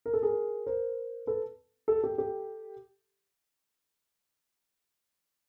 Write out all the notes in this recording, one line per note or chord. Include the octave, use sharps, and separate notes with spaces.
A#4
A4
G#4 A#4
A#4 C5
A4 B4
G4 A4
G4 A4
G4 A4